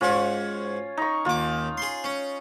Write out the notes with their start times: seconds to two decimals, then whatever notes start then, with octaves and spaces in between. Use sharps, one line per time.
0.01 G#2 C#4 F4 F#4
0.97 D#4 C#6
1.25 D#2 F4 D6
1.78 G#4 C6
2.04 C#4